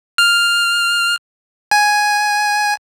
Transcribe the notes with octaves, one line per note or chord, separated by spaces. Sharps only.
F6
G#5